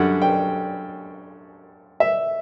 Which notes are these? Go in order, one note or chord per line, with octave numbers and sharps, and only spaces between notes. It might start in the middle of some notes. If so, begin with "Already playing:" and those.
Already playing: F#2 D3 G3 F#5
G5
E5